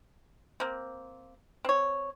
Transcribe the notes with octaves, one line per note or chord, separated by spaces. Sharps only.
A#3 C4
C4 C#5